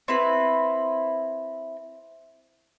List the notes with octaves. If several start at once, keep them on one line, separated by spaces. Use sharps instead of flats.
C4 E4 B4